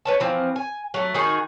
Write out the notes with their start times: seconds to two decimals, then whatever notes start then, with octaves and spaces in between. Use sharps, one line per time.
0.05 B4 C#5 A5
0.20 E3 F3 C4
0.56 G#5
0.94 F#3 A3
1.14 D#3 D#4 F#4 G#4